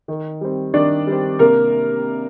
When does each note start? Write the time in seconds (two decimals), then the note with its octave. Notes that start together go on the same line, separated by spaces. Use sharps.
0.08 D#3
0.41 G3 C4
0.74 D#3 D4 D5
1.07 G3 C4
1.39 C3 A#3 A#4